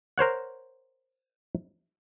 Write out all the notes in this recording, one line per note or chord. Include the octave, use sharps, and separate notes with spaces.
A#4 C5 C#5 F#5